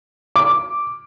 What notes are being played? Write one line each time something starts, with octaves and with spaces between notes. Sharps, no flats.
D6